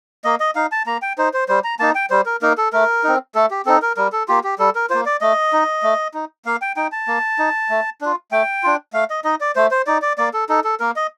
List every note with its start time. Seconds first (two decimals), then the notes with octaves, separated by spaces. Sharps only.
0.24 A#3 D#5
0.40 D#5
0.55 D#4 F5
0.72 A5
0.86 A#3 A#5
1.02 G5
1.18 D#4 C5
1.34 C5
1.48 G3 C5
1.64 A#5
1.79 A#3 D#4 A5
1.95 G5
2.10 G3 C5
2.26 A#4
2.42 A#3 D#4 A#4
2.58 A4
2.73 A3 A#4
3.04 C4 D#4
3.35 A3 A4
3.51 G4
3.65 C4 D#4 A4
3.82 A#4
3.97 G3 A#4
4.12 A4
4.28 A#3 F4 G4
4.44 G4
4.59 G3 A4
4.75 A#4
4.90 A#3 F4 C5
5.06 D5
5.21 A3 D#5
5.53 D#4
5.83 A3
6.14 D#4
6.45 A#3 F5
6.62 G5
6.76 D#4 G5
6.92 A5
7.08 A#3
7.39 D#4
7.70 A3
8.01 D4 F4
8.32 A3 G5
8.63 D4 F4
8.93 A3 F5
9.10 D#5
9.24 D#4 D#5
9.41 D5
9.55 A3 C5
9.71 C5
9.87 D#4 D5
10.02 D5
10.18 A#3 D5
10.34 A4
10.49 D#4 A4
10.64 A4
10.80 A#3 A#4
10.96 D#5